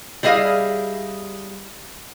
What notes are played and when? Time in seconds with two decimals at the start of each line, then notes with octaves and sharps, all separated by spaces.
0.23 G3 E4 G#4 D#5 F5